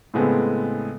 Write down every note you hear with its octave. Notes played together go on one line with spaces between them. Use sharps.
A2 C#3 G#3 B3 C4 A4